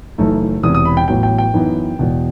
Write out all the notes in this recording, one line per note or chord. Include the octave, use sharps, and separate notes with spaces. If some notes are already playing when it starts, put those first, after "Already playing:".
F#1 F#2 E3 A3 D#4
E1 E2 C3 D#6
D#6
B5
G5
A1 A2 F#3 B3 G5
G5
G5
F#2 E3 B3 D#4
E1 E2 B2